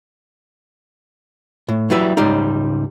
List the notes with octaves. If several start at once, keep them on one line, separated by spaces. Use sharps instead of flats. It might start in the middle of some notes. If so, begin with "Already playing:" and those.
A2
F#3 G3 E4 B4 E5
C#2 G#2 G3 D#4